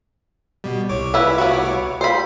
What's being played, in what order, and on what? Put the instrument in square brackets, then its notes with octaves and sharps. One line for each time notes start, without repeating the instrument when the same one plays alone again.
[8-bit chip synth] B2 G3
C2 C#5 D6
[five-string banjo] E4 B4
B3 F#4
[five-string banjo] C5 B5 [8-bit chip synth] C7